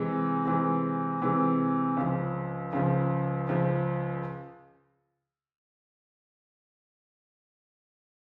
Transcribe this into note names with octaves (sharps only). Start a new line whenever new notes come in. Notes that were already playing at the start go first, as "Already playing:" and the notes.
Already playing: C3 E3 G#3
C3 E3 G#3
C3 E3 G#3
C#2 C#3 F3
C#2 C#3 F3
C#2 C#3 F3